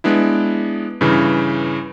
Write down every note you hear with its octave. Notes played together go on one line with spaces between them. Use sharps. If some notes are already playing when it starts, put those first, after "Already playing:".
G#3 B3 D4 E4
G2 C#3 E3